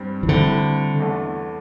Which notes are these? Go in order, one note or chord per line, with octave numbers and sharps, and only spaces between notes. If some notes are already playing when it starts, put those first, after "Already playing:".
Already playing: G2 G3 C4
E3
A2 D3 G3 C4
E2 D3 A3